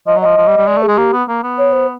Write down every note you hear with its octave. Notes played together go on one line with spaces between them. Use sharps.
F3 D#5
F#3
F3 D#5
F3
G3
G3
G#3 D5
A3
G#4
G#3
A#3 G4
B3
A#3
B3
C#5
C5